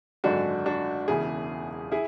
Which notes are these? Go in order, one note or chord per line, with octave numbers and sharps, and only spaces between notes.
G#1 F#2 D3 G#3 D4 F#4
D4 F#4
E1 E2 C#3 E4 G#4
E4 G#4